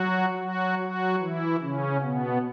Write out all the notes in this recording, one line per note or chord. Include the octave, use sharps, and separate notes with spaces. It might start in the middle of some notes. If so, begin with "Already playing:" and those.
Already playing: F#3 F#4
F#3 F#4
F#3 F#4
E3 E4
C#3 C#4
B2 B3